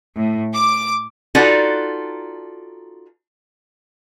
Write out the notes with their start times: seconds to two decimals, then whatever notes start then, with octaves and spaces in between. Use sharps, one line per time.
0.15 A2
0.54 D6
1.35 D#4 F4 F#4 A4 B4 D5